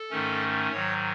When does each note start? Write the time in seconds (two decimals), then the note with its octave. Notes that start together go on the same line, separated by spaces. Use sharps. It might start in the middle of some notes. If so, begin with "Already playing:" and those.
Already playing: A4
0.10 G#2 D#3 A3 C#4
0.72 G#2 D#3 F#3 C#5